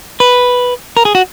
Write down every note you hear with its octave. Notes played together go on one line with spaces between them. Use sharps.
B4
A#4
G#4
F#4